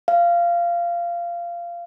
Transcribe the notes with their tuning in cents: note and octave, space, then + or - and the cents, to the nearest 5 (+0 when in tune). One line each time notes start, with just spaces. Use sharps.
F5 -15